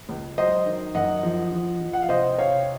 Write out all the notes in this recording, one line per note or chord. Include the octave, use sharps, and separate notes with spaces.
C#2
F#3 C5 D#5
D#3
F#2 D#5 F#5
F3
F3
F3
F#5
F5
C3 C5 D#5
C3 C#5 F5